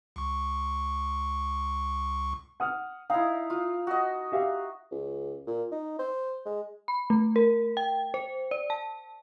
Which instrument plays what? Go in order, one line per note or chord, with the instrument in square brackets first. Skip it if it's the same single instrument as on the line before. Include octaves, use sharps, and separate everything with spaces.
[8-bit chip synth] C#2 C#6
[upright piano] F#5 D#6 F6
[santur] D#4 E4 [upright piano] F5
[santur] F4
F#4 D#5
[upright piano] G4 E5 F5
[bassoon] C#2
A#2
D#4
C5
G#3
[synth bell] B5
A3
A#4
G5
C5
D5
A5